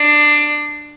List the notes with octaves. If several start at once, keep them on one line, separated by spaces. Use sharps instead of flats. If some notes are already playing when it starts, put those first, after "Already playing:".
Already playing: D4